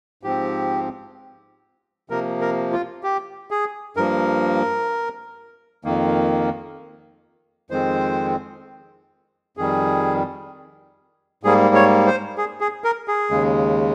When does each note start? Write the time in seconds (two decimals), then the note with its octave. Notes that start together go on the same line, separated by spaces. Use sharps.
0.23 G#2 F3 C4 G4
2.10 C3 F3 A#3 A#4
2.41 A#4
2.72 F4
3.03 G4
3.51 G#4
3.97 G2 F3 A#3 A#4
5.84 F2 D#3 A#3
7.70 F2 D#3 G#3 C4 C5
9.57 F2 D#3 G3 G#4
11.43 G#2 G3 A#3 G#4
11.75 C#5
12.07 C5
12.38 G#4
12.61 G#4
12.84 A#4
13.08 G#4
13.30 D#2 C#3 G#3